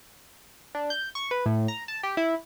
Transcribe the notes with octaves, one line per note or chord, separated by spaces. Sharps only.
D4
G6
C#6
B4
A2
A#5
A5
G4
E4